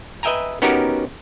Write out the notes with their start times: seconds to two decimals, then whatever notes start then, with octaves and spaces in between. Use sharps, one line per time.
0.23 B4 D#5 E5 G5 G#5 A#5
0.62 B3 C#4 D#4 F#4 G4 A#4